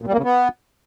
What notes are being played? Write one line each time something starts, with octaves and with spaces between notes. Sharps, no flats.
A#2
G3
A#3
C#3
B3